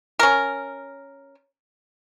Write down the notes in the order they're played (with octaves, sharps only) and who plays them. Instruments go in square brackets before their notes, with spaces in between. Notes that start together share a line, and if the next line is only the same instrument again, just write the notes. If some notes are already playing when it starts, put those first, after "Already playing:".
[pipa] C#4 A#4